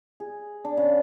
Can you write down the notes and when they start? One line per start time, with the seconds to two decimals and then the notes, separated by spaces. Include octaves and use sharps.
0.20 G#4
0.65 D4
0.77 C#3